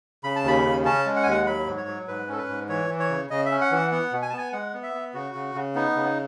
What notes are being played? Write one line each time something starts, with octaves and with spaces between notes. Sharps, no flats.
C#3 B5
A5
D#2 B5
C#3
C#4 A5
G#3
F#5
G#5
D#2 F#5
F#3 B5
G#2
C#5
F#3
G#2 B4
C#4 A4
B4
G#2
E3 C#5
E3
C#5
C#3
C#3 D#5
E5
C#4
F#5
E3 F#5
B3 F#5
B2
G#5
B3 A5
G#5
G#3 F#5
B3
E5
B3
C#3 F#4
C#3
C#3
B3 D#4
C#3